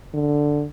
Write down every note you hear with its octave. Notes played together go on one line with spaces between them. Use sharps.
D3